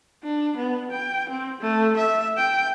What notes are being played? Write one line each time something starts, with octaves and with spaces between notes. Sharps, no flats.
D4
B3
G5
C4
A3
E5
G5